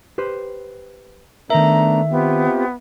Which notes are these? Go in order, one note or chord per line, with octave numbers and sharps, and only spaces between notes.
G4 B4 C5
D#3 A3 B3 D4 A#4 E5 A#5
B3 C4 F4 G4